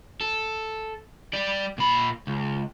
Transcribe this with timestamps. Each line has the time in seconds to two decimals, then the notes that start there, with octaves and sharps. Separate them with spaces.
0.21 A4
1.33 G3 D5
1.78 A#2 B5
2.27 C#2